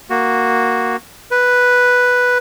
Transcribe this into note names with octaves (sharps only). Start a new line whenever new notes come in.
A#3 F#4
B4